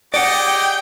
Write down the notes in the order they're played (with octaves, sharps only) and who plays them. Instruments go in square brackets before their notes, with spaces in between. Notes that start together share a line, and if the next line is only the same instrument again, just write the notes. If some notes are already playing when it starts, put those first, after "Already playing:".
[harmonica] G4 G#4 D#5 [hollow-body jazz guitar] D5 F#5 [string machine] G5 G6